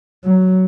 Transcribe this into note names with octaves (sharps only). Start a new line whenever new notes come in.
F#3